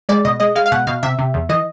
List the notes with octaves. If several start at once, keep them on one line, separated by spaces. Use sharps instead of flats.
G#3 D5
B2 D#5
G#3 D#5
G#3 F5
F5
B2 F#5
B2 F5
C3 E5
C3
E2
E3 D#5